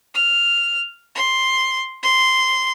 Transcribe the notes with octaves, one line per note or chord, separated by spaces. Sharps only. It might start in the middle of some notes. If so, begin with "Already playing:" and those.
F6
C6
C6